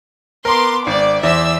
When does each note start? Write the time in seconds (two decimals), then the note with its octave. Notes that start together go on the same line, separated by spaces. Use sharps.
0.45 B3 A#4 A#5 C6 D6
0.87 G#1 D5
1.23 E2 C5 D5 E5 E6